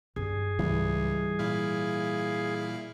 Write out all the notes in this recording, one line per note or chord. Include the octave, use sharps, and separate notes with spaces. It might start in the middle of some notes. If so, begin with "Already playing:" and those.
G2 F#3 G#4
C#2 G#2 E3 G3
A#2 E4 F5